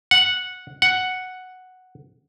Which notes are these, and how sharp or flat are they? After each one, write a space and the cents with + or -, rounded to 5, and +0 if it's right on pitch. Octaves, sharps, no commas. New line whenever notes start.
F#5 -10
F#5 +0